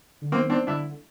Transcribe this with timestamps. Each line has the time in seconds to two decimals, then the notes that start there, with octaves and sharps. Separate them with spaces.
0.22 D3
0.32 D#3 A#3 C4
0.50 C4 D4
0.67 D3 D4 E4